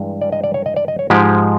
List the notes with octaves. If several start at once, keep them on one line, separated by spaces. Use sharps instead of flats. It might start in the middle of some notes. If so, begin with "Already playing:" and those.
Already playing: G2 E3 G#3
D5
D#5
D5
C#5
D#5
D5
D#5
C#5
G#2 F3 G#3 G4